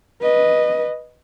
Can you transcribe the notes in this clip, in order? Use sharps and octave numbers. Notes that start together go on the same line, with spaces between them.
B4 D#5